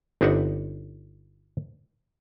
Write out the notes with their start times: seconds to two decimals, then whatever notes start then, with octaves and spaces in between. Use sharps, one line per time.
0.21 G1 C4 D4 D#4 E5 F#5